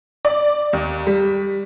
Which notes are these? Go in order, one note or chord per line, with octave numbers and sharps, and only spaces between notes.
D5
D#2
G3